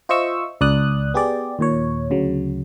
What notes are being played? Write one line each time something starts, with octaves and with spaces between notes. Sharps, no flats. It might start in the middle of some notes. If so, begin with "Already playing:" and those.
F4 C5 D#5 E5 C#6 E6
C#2 D5 D#6 F#6
B3 G4 G#4 D5
D#2 A#2 C#5
D2 C#3 F#3